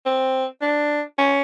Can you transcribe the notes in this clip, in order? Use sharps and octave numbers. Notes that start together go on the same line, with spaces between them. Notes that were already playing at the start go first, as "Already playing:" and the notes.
C4
D4
C#4